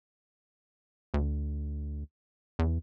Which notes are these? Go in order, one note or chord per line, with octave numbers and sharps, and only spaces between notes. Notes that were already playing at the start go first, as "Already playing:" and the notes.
D2
E2